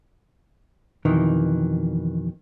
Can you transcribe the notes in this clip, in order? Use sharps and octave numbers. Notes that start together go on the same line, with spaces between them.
F2 B2 D#3 E3